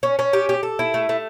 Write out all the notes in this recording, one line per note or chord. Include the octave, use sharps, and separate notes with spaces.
C#4
C#4
G4
G4
A4
E4
A3
A3